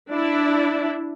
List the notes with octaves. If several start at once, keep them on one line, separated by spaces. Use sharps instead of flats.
D4 E4